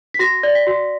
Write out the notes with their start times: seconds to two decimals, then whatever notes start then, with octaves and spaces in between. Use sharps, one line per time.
0.14 B6
0.19 F#4 A#6
0.43 D5
0.55 B6
0.67 F#4